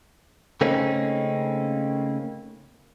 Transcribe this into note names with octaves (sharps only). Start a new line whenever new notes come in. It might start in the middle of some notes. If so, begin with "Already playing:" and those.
C#3 A3 A#3 C4 C#4 D#4